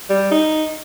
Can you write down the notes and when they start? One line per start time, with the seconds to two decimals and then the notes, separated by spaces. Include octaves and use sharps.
0.09 G3
0.31 D#4